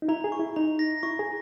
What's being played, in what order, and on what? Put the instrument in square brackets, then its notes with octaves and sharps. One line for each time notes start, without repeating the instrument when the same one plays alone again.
[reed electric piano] D#4
[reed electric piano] E4 [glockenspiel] A#5
[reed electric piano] G#4
[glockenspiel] C#6
[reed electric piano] E4
[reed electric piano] D#4 [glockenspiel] A#5
[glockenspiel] A#6
[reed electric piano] E4 [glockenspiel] C#6
[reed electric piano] G#4